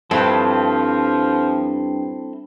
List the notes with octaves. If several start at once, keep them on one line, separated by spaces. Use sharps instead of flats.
G2 F3 C4 E4 A4